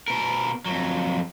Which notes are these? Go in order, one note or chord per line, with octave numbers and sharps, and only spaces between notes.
B2 A#4
F2 F#3